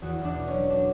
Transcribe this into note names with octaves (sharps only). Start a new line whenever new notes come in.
E2 F#4
E2
D4
B2
C#4
F#3
D4